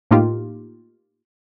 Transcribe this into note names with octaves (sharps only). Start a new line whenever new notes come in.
A2 A#3 D#4 F4 G4